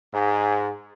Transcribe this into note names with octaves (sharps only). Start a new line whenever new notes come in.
G#2